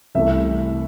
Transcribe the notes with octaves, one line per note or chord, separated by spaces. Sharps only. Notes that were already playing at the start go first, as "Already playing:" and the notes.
C2 C3 E3 A3 E5